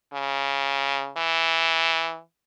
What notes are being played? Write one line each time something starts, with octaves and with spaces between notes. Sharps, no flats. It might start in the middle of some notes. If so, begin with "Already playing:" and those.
C#3
E3